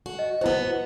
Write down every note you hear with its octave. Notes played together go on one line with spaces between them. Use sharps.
F#4
D#5
B3 E4 F#4 C5